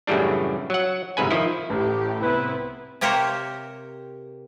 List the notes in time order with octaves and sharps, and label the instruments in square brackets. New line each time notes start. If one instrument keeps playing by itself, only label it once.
[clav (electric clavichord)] F#2 A2 C#3 E3 G3 D4
F#3 F#5
G1 C2 G#2 B4 G#5
D#3 F3 E4
[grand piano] A1 [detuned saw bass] A2 [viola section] G4
[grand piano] C2 [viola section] B3 C4 E4 [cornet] B4
[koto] C3 A#3 G4 A#4 C5 C#5